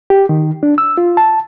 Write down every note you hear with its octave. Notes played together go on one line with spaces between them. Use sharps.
G4
D#3
D4
E6
F4
A5